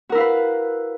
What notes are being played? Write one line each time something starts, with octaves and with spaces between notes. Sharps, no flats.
E4 F#4 A#4 B4 F5